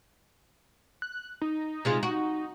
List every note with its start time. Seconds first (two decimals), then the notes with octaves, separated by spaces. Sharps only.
1.02 F#6
1.42 D#4
1.85 C3 G#3 F4
2.03 F#4